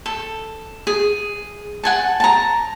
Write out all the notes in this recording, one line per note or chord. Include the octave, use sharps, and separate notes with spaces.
A4
G#4
F#5 G#5 A5
A5 A#5